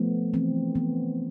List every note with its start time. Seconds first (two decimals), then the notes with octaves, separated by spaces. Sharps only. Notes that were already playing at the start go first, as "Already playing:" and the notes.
Already playing: F3 A3 B3
0.34 E3 C4
0.75 E3 B3